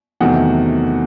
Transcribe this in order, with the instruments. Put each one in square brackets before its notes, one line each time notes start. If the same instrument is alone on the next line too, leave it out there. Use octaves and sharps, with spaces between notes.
[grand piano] E2 C3 D#3 F#3 A3 F#5